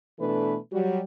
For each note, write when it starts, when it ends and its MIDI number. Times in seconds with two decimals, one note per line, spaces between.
0.19 0.56 47
0.19 0.56 52
0.19 0.56 57
0.19 0.56 62
0.19 0.56 69
0.19 0.56 71
0.72 1.00 54
0.72 1.00 55
0.72 1.00 66